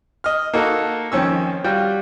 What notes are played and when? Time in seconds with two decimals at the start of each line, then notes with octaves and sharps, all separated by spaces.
0.24 D#5 F6
0.53 A#3 D#4 F#4 A4
1.12 F2 D#3 C4 C#4 E6
1.64 G3 F4 F#4 G5